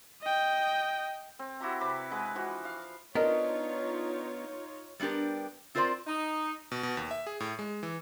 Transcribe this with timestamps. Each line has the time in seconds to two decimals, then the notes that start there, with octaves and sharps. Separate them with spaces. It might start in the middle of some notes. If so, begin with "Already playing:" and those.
0.22 D#5 G5
1.39 C4
1.61 E4 F#4 G4 A#5
1.81 C3 B4 B5 D6
2.12 G#3 B4 F#5
2.35 E3 F3 F#4
2.65 F5
3.15 B3 D4 D#4 F4 A#4 C#5 D#5
5.00 G3 B3 D4 G4 A#4
5.75 C4 F4 A#4 C5 D5
6.07 D#4
6.72 B2
6.83 B2
6.97 D#2
7.11 E5
7.27 G#4
7.40 A2
7.59 G#3
7.83 E3